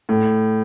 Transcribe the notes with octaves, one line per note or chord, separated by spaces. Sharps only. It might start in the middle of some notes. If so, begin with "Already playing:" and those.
A2